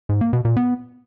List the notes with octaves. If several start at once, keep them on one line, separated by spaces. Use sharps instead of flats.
G#2
A#3
B2
A#2
B3